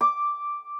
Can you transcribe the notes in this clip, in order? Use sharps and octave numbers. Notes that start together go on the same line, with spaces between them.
D6